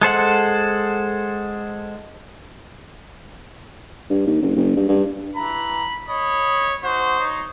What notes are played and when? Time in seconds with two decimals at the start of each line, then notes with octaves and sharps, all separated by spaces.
0.01 G#3 A4 C5 F#5
4.10 G2
4.27 D#2
4.42 F#1
4.56 F#1
4.76 G2
4.89 G2
5.36 E3 A#5 B5
6.08 C#5 D#5 B5
6.83 D#4 F#4 C5
7.19 D#4 C#5